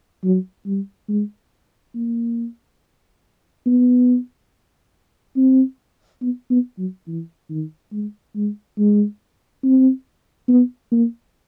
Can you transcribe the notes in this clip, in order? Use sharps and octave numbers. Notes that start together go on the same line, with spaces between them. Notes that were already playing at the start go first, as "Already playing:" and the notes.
F#3
G3
G#3
A#3
B3
C4
B3
B3
F#3
E3
D#3
G#3
G#3
G#3
C4
B3
A#3